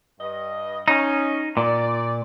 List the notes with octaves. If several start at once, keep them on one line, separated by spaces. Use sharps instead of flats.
G2 D#5
C#4 D#4
A#2 D5